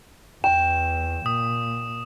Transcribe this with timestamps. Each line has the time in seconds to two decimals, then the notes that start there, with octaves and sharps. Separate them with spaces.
0.44 E2 G5 E7
1.26 A#2 D#6